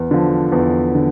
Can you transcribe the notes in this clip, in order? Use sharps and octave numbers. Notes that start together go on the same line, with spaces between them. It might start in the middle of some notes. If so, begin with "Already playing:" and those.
Already playing: E2
D3 F3
E2
D3